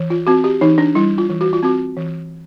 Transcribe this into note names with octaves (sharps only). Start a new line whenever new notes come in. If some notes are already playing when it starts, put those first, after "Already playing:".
Already playing: E3
F4
C4 F#4
G4
E3 D#4
D4
G3 E4
F4
E3
F#4
F4
C4 F#4
E3